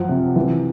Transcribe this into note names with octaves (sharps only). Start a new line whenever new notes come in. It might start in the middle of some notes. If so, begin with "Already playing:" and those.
Already playing: F#2 F3 F#5
C3
E3